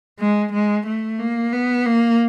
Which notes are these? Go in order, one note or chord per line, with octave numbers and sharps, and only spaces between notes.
G#3
G#3
A3
A#3
B3
A#3